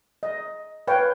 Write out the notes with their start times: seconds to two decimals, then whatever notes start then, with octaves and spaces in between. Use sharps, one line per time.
0.23 D#5
0.88 B4 C#5 F5 G5